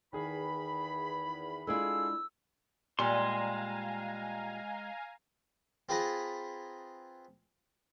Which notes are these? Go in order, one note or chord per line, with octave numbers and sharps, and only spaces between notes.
E2 D#3 G#4 B5
G#3 D4 E4 F4 G#4 A4 E6
A#2 G3 G#3 F5 G#5 A#5 C6
C4 F4 G#4 B4 A5 A#5